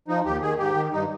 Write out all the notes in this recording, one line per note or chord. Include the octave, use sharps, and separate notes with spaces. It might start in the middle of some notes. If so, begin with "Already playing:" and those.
F3 D#4
D#2 G4
D#3 G#4
G#2 G4
D#3
G2 D#4